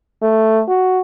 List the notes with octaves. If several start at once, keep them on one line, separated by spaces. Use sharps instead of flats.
A3
F#4